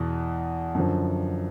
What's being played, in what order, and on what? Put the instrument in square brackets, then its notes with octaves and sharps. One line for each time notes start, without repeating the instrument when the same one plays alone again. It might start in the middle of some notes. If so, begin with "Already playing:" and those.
Already playing: [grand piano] E2 B2
F#2 D3 F3